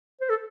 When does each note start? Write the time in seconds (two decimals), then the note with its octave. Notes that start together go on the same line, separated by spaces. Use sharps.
0.21 C5
0.30 A4